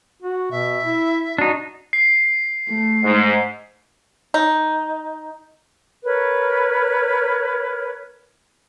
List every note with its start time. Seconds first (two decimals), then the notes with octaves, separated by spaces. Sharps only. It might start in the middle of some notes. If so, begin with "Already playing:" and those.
0.22 F#4
0.51 B2 E5
0.84 E4
1.38 D4 D#4 F#4
1.93 C7
2.69 A3
3.04 G#2
4.34 D#4
6.04 A#4 B4 C#5